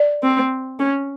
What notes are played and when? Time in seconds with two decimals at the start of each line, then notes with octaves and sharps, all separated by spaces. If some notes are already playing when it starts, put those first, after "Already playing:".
Already playing: D5
0.23 C4
0.79 C#4